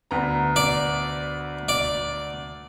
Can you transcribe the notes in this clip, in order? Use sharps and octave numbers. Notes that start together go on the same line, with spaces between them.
D2 B3 A#5
D5
D5